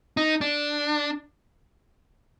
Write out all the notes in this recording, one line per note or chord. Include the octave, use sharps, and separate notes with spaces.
D#4
D4